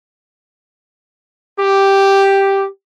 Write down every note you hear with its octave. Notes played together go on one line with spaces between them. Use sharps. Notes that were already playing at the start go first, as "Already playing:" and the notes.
G4